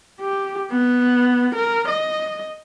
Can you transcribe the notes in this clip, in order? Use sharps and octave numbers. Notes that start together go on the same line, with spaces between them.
G4
B3
A#4
D#5